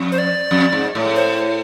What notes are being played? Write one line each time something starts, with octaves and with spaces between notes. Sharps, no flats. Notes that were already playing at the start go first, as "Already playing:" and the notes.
Already playing: F2
C5
D5
F2
G#2
A2
C5